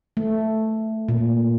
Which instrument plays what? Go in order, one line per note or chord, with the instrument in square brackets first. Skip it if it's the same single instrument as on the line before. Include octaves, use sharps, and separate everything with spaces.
[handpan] A3
A#2